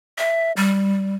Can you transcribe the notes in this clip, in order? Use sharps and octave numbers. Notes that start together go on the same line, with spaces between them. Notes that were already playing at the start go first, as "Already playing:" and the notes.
E5
G3